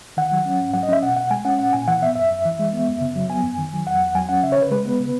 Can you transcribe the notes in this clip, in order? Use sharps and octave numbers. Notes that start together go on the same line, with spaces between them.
D#3 F#5
F#3
C#4
G#2
F#3 F#5
D#5
C#4 E5
B2 F#5
B2 F#5
G#3 G#5
C#4 F#5
A#2 F#5
A#2 G#5
E3 F#5
B3 E5
F#2 E5
F#2
E3
G#3
B3
F#2
C#3
F#3
B3 G#5
F#2
D#3
F#3
E2 F#5
E2
F#3 G#5
C#4 F#5
C#3 E5
C#5
C#3 B4
G#3 B4
B3
C#3